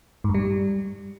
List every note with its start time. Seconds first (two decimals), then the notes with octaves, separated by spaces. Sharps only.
0.24 G#2
0.29 G2
0.34 G3